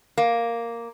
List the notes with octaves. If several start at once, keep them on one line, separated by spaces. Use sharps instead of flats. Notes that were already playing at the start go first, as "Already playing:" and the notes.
A#3